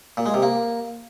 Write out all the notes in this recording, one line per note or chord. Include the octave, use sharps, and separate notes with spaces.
A#2
G#3
C3
A#3